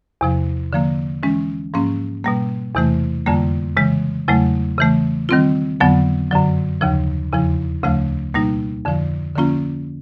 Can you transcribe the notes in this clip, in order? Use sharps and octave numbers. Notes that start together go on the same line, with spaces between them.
E2 C3 F3
D3 F3 A#3
E3 G#3 C#4
G#2 F3 A#3 C#4
B2 G3 A#3
E2 C3 E3 A3
F2 D3 G3 A#3
C#3 E3 G#3
E2 C#3 F#3 A3
C#3 E3 A3
D#3 G3 C4 F4
F2 D3 F#3 B3
F#2 D3 F#3
D#2 C#3 F3
E2 C#3 F3
D2 C#3 F3 A3
B2 G3 A#3 D#4
F2 D3 F3
D3 F3 A#3 C#4 F4